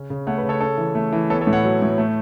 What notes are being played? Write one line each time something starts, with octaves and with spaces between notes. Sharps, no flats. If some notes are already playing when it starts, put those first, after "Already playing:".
Already playing: C#3 C#4
C#3
A3 C#5 F#5
B4
C#3
A4 C#5
C#4 A4 C#5
E3
A3
E3
B3 A4 C#5
A4 C#5
A2
C#5 F#5
F#3
A2
A3